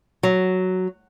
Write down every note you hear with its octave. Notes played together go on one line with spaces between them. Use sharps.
F#3